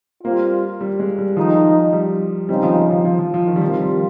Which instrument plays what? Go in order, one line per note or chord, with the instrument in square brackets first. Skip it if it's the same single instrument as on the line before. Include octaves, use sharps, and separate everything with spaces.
[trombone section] G3 C4 F4 [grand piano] A#3
[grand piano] G3
G#3
G3
[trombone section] D#3 G#3 D#4 [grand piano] F3
[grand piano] G3
[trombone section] C#3 G#3 C4 D#4 [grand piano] G3
[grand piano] F3
F3
F3
F3
F3
F3
D#3
G3
[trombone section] C3 D#3 A#3 F4 [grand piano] F3
[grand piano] G3